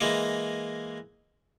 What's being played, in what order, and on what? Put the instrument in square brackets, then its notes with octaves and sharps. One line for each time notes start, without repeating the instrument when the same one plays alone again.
[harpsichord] E3 G#3 A#3